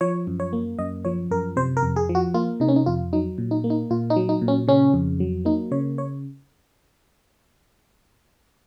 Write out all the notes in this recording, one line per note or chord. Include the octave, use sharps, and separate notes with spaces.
F3 C#5
F#2
C#5
A#3
F#2 D#5
F3 C#5
F#2 A#4
C3 C5
A#4
F2
G#4
F3
F#4
A#3 F4
C3 D#4
C#4
D#4
F2 F4
F#3 D#4
A#2
D#4
A#3
D#4
A#2 F4
D#4
F#3
D#4
A#2
C#4
C#3 C#4
F2
F#3
A#3 D#4
C#3 C#5
C#5